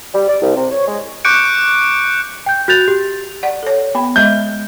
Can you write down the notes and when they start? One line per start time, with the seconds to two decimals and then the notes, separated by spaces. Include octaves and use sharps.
0.14 G3
0.28 D5
0.42 C2
0.56 C3
0.72 C#5
0.87 G#3
1.25 C#6 D6 F#6 G6 C#7 D7
2.46 G5 G6
2.68 F#4 F#6 G6 A6 F7
2.88 G4
3.43 D5 F#5
3.63 A4 C#5
3.95 B3 G5 B5
4.16 G#3 D#5 G6